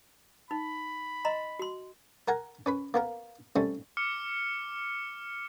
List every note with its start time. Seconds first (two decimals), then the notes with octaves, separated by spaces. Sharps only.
0.51 D#4 B5
1.25 D#5 A#5 C6
1.59 F#4 C6
2.28 A#4 F#5 G#5 A#5
2.66 C#4 B4 B5
2.94 A#3 B3 A#4
3.56 G3 A3 C4 C#4
3.97 D6 F6 C#7